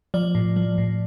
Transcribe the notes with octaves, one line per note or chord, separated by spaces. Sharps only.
F3 D5
A2
F3
A2